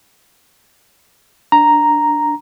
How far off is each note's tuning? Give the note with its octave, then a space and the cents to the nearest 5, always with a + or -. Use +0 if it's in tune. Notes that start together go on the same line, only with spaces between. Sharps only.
D4 +0 A#5 +0